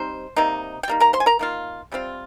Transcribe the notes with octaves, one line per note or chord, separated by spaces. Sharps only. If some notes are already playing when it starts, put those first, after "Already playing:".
Already playing: G3 C4 D#4 C5
C3 G3 A#3 D#4
G5
G3 A#3 D#4
A#4 A#5
C5 C6
G#5
A#4 A#5
D#3 A#3 F4
C3 G3 C4 F4